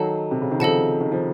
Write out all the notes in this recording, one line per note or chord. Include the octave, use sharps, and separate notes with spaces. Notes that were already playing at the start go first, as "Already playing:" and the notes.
Already playing: D#3 F#3 A4 D#5 F#5 A5
C3
C#3
D#3
C#3 F3 A4 D#5 F#5 A5
D#3
F3